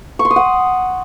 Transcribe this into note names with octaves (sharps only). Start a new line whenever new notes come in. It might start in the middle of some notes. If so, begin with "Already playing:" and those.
C#6
C6
D#6
F#5